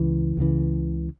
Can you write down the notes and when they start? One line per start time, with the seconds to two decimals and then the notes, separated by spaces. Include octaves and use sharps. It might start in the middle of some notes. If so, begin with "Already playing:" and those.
Already playing: C#2 C#3 E3
0.37 C#2 C#3 E3